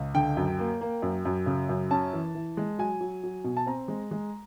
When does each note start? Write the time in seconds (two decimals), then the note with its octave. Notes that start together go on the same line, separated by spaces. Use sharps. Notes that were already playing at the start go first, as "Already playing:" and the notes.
Already playing: C#2
0.14 D3 G5
0.37 F#2
0.59 A#3
0.81 A#3
1.02 F#2
1.25 F#2
1.46 C#3
1.69 F#2
1.91 C#4 A5
2.13 E3
2.35 E3
2.57 G#3
2.78 F#3 G#5
3.01 F#3
3.23 F#3
3.44 B2
3.57 A5
3.66 C4 A#5
3.88 G#3
4.11 G#3